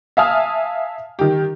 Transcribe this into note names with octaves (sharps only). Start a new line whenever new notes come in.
E5 F5 G#5 A5 D#6 F6
D#3 G4